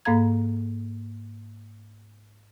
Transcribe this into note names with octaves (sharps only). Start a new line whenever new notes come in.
G#2 A#3 A4 F5 A#5 G#6